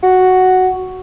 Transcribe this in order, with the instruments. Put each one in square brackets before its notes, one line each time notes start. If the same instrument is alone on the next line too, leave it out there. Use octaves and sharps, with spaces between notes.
[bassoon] F#4